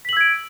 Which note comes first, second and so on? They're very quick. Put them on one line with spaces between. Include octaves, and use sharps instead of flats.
B6 F#7 E6 G#6 D7